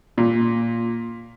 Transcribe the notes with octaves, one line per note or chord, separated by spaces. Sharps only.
A#2